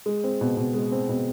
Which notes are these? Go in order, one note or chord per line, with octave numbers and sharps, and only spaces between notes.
G#3
C4
B2
B2
G#3
C4
B2